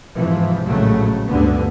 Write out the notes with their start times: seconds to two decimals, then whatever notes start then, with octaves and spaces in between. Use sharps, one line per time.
0.16 F2 G#2 C3 E3 F3
0.67 A#1 A2 C#3 F#3 G#3 A3
1.28 D2 G2 D3 B3